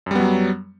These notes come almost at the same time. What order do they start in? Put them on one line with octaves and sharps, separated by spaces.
F#2 G3 B3 F#3